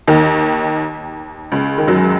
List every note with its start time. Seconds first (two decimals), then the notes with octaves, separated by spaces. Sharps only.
0.08 D#2 D#3
1.52 C#2 C#3
1.78 D#3
1.87 F#2 F#3